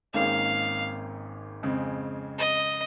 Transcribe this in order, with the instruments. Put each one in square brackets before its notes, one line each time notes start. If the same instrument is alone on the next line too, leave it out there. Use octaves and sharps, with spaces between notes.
[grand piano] G#1 G#2 D#3 A#3 C#4 [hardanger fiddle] F5
[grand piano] F2 C#3 G#3 C4
[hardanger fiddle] D#5